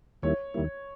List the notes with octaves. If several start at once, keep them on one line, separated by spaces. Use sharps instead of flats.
D#2 D#3 G3 A#3 E4 C#5
D#2 D#3 G3 A#3 E4